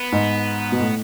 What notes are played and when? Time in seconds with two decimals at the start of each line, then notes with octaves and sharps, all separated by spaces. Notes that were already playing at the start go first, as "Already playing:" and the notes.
Already playing: B3
0.12 G#2
0.72 B2
0.79 A2